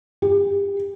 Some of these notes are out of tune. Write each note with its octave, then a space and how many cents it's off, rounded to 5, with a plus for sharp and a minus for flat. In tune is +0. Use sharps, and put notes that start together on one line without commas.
G4 +30